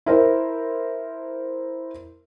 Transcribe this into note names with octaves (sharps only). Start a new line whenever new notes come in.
E4 A#4 C5